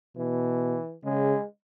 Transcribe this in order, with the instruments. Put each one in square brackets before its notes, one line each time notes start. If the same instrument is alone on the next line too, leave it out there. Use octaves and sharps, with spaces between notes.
[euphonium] B2 [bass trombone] E3
[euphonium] C#3 [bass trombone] G#3